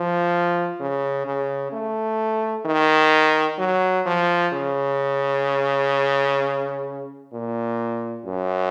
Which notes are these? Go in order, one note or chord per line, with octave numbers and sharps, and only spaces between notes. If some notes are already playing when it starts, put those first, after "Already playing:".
Already playing: F3
C#3
C#3
A3
D#3
F#3
F3
C#3
A#2
F#2